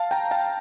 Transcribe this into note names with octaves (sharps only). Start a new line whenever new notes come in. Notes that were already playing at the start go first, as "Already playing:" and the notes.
Already playing: F5 A5
G5 A#5
F5 A5